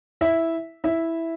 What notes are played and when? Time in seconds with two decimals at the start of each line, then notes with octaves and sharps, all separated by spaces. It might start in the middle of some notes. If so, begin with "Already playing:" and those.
0.21 E4 E5
0.84 E4 E5